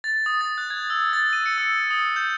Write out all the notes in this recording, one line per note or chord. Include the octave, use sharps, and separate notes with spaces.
A6
D#6
A6
F#6
G#6
E6
A6
D#7
C#7
E6
D#6
G6